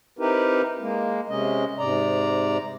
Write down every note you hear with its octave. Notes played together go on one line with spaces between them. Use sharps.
C4 D#4 E4 G4 A#4 B4
G#3 A#3
C3 G#3 C#4 D#5
G#2 C3 D5 A#5